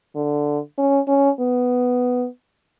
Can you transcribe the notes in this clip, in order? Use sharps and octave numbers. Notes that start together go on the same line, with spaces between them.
D3
C#4
C#4
B3